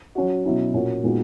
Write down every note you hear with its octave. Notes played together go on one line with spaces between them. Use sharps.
F#3 C#4 F#4
B2 F#3 C#4 E4
A#2 A#3 C#4 F#4
A#2 G#3 B3 D#4 F#4